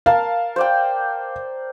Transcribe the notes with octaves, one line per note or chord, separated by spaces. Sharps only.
A#4 F5 A5
C5 D5 G5